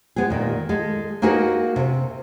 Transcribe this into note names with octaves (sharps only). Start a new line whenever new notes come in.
G#3 B3 G4 G#4
A#2 D#3
G#3 A4
A#3 D#4 F#4 G#4 A#4 B4
C3